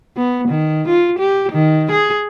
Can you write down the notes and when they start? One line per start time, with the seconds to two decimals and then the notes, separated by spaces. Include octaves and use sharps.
0.17 B3
0.48 D#3
0.88 F4
1.19 G4
1.52 D#3
1.91 G#4